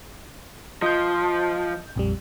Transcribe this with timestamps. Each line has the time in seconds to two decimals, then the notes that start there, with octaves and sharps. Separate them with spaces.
0.82 F3 D#5 G6
1.96 A#1 F2 G3